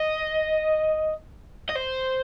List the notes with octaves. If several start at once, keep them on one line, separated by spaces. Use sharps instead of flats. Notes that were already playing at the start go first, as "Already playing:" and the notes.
Already playing: D#5
D#5
C5